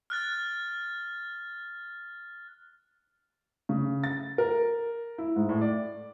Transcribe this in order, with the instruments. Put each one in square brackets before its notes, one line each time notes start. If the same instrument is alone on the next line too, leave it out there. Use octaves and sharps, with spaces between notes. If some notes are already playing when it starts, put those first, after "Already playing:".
[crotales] F6 F#6 A6
[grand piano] C#3
A6
A#4
E4
G#2
A2
D5